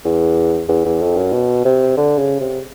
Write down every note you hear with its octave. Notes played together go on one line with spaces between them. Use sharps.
E2
E2
E2
F2
F#2
B2
C3
D3
C#3
C3